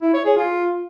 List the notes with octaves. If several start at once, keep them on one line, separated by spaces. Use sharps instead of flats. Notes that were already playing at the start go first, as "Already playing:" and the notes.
E4
C#5
G#4
F4